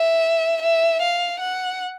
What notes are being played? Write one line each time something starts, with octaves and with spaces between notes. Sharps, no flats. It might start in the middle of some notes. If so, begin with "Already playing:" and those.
Already playing: E5
E5
F5
F#5